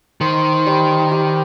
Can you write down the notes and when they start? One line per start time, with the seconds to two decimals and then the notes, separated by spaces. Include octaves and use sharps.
0.21 D#3 C5
0.66 G3
1.12 G4